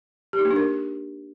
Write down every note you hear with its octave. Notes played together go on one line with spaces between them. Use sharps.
G4
D#4
A#3
D4
A#4